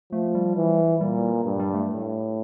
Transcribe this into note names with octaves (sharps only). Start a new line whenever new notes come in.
F3 A3
G3
E3
A#2 G3
G2
G3
A3
A2